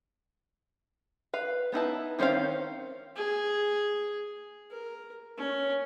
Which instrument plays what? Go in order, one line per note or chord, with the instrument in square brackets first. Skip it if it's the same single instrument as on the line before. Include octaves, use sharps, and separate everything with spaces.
[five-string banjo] B4 F5
B3 D#4 E4 A5
D#3 C4 C#4 C5 F5
[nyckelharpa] G#4
A#4
C#4